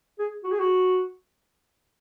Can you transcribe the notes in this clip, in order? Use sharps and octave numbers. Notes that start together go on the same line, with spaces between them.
G#4
F#4
G#4
F#4